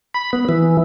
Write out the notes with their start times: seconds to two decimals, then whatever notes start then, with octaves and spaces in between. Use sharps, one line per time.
0.14 B5
0.33 B3
0.49 E3